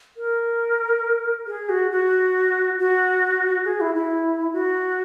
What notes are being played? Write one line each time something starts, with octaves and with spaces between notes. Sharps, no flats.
A#4
G#4
F#4
F#4
F#4
G#4
E4
E4
F#4